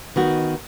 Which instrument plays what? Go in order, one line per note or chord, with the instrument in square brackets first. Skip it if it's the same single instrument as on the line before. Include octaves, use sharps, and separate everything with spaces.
[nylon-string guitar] D#3 B3 D#4 F#4